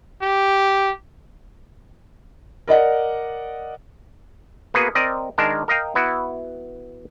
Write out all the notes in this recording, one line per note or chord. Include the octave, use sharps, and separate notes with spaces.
G4
A#4 D5 D#5 F#5
A#3 B3 F#4 G#4 B4
C4 A#4 D5 D#5
D#3 G#3 D4 A#4 A5
A#4 D#5 F5 G5
B3 E4 F#4